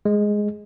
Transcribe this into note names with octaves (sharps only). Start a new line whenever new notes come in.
G#3